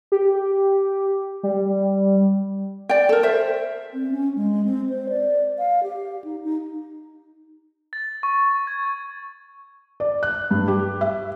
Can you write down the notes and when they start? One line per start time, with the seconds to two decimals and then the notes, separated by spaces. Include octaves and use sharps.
0.12 G4
1.43 G3
2.89 D5 G5
3.09 A4 A#4
3.23 C5 E5
3.94 C4
4.12 C#4
4.36 G#3
4.65 C4
4.89 C5
5.09 D5
5.58 F5
5.83 G4
6.24 D#4
6.44 D#4
7.93 A6
8.23 C#6
8.67 G#6
10.00 D5
10.23 F#6
10.51 G2
10.68 G4
11.01 E5